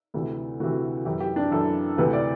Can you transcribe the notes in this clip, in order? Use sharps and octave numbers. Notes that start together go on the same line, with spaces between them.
D2 C3 E3
D2 C3 E3 F#4
F#2 E3 G4
G4
D4
F#2 E3 A4
D2 C3 E3 B4
D5